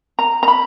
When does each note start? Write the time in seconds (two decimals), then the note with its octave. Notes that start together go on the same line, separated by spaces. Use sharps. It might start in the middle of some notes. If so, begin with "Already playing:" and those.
0.19 A#5
0.43 A#5
0.48 B5